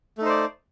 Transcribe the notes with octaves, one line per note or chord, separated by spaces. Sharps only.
A3 D#4 C5 D5